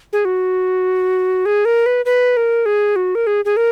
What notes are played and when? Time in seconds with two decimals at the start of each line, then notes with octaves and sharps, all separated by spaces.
0.13 G#4
0.25 F#4
1.46 G#4
1.65 A#4
1.86 B4
2.05 B4
2.37 A#4
2.66 G#4
2.96 F#4
3.15 A#4
3.27 G#4
3.45 G#4
3.57 A#4